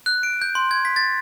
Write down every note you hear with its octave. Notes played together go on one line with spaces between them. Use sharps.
F#6
D7
G6
C6
G#6
B6
A6